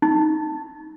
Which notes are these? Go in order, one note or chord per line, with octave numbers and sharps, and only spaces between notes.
D#4